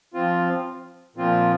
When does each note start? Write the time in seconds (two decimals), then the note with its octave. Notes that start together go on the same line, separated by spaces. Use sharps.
0.14 F3 C4 F4
1.16 A#2 F3 C4 F4